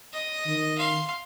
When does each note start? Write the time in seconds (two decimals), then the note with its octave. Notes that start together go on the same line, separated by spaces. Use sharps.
0.13 D#5
0.47 D#3
0.78 F5 C6